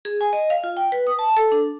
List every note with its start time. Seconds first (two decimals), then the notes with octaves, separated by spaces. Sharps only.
0.05 G#4
0.21 G#5
0.33 D#5
0.50 F5
0.64 F4
0.77 G5
0.92 B4
1.07 D#6
1.19 A5
1.37 A4
1.52 D4